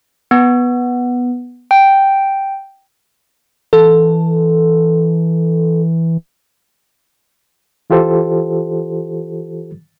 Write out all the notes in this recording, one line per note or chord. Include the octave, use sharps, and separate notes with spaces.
B3
G5
E3 A4
E3 F4 G4 A4 C5